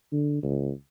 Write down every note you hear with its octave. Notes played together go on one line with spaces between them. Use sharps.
D3
C#2